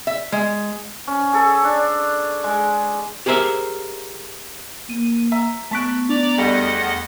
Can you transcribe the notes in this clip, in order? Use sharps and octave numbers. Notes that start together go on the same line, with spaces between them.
E5
G#3
C#4
G#4 A4
D4
G#3
G4 G#4 A#4 C5 E5
A#3 D#7
E5 A#5
A3 B3 A5 C#6 F#6 B6 D7
D4 D5 A#5 D6
E2 G3 A3 G4 D#5 F#5